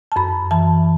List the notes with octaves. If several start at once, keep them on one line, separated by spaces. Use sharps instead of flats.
A5
F#2 B5
E3 A5